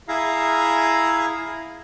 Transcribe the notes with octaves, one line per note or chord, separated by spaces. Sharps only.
E4 G#4 E5 F5 A#5